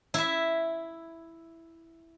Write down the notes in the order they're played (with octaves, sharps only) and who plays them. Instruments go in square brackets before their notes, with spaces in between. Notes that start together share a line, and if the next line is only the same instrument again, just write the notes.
[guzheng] E4 E5